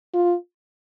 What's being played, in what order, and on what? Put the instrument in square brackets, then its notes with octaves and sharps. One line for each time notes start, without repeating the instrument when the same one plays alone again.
[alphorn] F4